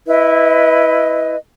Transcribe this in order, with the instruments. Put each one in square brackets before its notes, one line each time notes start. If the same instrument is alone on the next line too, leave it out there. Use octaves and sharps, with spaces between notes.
[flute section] E4 B4 D#5